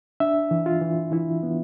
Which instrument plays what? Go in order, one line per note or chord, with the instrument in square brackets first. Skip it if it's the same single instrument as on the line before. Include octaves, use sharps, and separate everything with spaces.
[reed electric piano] D4 E5
E3
F4
E3
E3 E4
B3